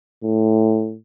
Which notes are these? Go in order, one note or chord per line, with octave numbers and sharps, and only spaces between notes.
A2